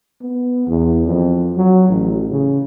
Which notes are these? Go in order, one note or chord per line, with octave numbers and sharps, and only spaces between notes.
B3
E2
F2
F#3
A1
C#3